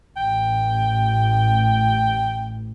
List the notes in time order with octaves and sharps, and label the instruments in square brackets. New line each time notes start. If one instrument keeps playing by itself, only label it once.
[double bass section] A1 [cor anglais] G5